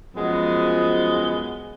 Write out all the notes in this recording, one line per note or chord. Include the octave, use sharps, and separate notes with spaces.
F#2 F3 G#3 B3